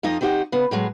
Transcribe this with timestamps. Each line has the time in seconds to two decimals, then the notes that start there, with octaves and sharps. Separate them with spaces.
0.03 F2 F3 D#4 D#5
0.21 D#3 C4 D#4 G4 F#5
0.52 C#3 B3
0.71 A2 F#3 G#3